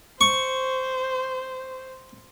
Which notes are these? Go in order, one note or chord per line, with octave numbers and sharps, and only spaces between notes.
C5 C#6